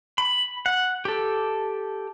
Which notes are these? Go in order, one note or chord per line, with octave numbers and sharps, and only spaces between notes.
B5
F#5
G4 A4